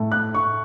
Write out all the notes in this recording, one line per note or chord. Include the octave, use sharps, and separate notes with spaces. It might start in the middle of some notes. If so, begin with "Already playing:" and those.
Already playing: A2 A3
F#6
C#6